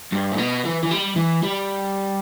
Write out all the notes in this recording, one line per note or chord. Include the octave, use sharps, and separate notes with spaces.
G2
A2
B2
E3
E3
G3
E3
G3